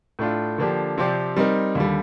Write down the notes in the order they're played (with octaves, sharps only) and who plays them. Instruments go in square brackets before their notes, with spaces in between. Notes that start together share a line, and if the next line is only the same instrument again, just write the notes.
[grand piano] A2 A3 D4 F4
D3 F3 A#3 D4 G4
C3 F3 C4 G4 D5
G3 C4 D#4 A#4
D#2 D3 G3